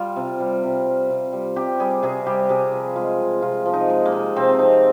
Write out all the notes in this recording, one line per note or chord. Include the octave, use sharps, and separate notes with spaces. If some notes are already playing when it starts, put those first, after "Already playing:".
Already playing: G3 F4
C3
G3
C3
G3
C3
G3
C3 G4
G3 G#4
C3 G#4
G3 G4
C3 G#4
F3
G#3 F4
C3
C3 F4
F3
D#4
G#3
A#3
C3
C3 C4
F3 D#4